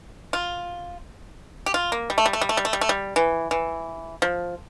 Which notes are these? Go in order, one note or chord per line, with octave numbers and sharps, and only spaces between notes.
F4
G4
F4
A#3
G3
A3
G3
A3
G3
A3
G3
A3
G3
A3
G3
E3
E3
F3